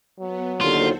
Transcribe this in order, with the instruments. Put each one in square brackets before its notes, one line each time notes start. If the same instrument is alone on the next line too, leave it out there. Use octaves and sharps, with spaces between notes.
[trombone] F#3 [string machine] B3
[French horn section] D#2 D3 [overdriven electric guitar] F4 [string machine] F#4 A4 C5